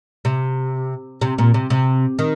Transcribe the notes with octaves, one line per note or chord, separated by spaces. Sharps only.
C3
C3
A#2
C3
C3
D#3